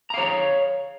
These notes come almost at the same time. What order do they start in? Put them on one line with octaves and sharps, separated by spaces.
A#5 F5 C#5